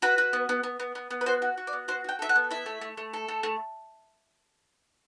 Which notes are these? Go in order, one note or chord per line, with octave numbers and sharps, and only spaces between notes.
F#4 B4
F#4
B3
B3
B3
B3
B3
B3
B4
F#4 C5
F#4
F#4
D5
B3
F#4 C5
F#4 G5
A4 E5
F#5
B3
E4 E5
A3
A3
A3
A4
A3
A3